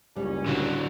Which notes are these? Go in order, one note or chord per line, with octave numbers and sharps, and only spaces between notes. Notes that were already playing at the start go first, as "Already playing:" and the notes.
F#1 C#2 G3 C#4
D3 F#3